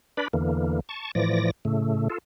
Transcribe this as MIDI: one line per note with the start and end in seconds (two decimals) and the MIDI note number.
0.17 0.28 62
0.17 0.28 71
0.17 0.28 74
0.17 0.28 83
0.33 0.80 40
0.33 0.80 50
0.33 0.80 52
0.33 0.80 58
0.89 1.11 81
0.89 1.11 85
1.15 1.51 45
1.15 1.51 52
1.15 1.51 53
1.15 1.51 74
1.15 1.51 94
1.65 2.08 45
1.65 2.08 49
1.65 2.08 57
2.10 2.18 65
2.10 2.18 69